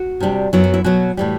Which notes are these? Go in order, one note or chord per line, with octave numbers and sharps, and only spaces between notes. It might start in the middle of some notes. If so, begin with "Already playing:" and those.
Already playing: F#4
C3 G3 D4
F#2 F#3 B3 E4
F#4
E4
B2 F#3 B3 F#4
A2 E3 G3